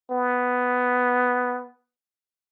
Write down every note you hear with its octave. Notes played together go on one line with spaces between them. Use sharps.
B3